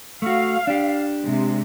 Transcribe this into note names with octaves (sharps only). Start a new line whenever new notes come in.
A3 F#4 F5
D4 G4
C3 G#3